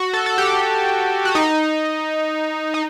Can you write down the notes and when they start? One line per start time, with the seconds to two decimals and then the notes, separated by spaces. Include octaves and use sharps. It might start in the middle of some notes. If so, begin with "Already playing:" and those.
Already playing: F#4
0.13 A4
0.26 A4
0.38 G4
1.25 F#4
1.35 D#4
2.74 D#4